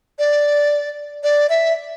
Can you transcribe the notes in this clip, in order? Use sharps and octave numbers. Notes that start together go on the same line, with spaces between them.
D5
D5
E5